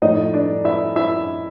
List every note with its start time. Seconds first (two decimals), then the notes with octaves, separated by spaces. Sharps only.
0.02 A2 F3 A3 D#4 D#5
0.34 D4 D5
0.65 E4 E5
0.96 E4 E5